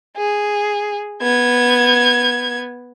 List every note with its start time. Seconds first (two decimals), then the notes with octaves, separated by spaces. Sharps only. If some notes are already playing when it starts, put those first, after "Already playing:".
0.17 G#4
1.22 B3 G#6